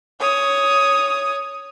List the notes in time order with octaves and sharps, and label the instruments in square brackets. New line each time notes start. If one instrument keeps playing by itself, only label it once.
[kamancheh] C#5 D#6